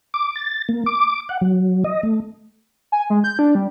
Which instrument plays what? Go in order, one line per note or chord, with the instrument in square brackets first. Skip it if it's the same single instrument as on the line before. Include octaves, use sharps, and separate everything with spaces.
[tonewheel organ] D6
A6
A#3
D6
F#5
F#3
D#5
A3
[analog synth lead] G#5
G#3
G6
D4
G3